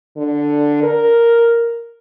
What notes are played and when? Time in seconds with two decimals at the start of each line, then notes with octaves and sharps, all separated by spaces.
0.17 D3
0.83 A#4